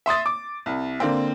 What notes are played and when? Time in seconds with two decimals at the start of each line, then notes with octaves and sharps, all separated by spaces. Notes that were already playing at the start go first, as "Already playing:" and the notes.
0.06 E5 C6 D#6 A6
0.26 D6
0.66 C2
1.00 D3 A#3 C4